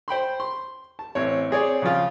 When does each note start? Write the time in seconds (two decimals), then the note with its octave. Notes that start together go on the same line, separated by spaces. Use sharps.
0.08 C5 G5 B5 C6
0.40 C6
0.99 A5
1.15 A1 C4 C#5
1.51 C4 G#4 C#5 D5
1.82 C#3 F3 F4